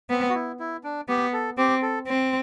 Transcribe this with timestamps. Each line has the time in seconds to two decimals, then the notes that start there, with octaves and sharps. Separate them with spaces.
0.10 B3 C4
0.30 F#4
0.35 E4
0.60 E4
0.84 D4
1.09 B3 G4
1.33 A4
1.58 C4 G4
1.82 A4
2.07 C4